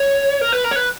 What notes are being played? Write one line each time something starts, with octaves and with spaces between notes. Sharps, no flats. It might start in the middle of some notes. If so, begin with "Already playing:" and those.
Already playing: C#5
A#4
B4
A#4
C#5
B4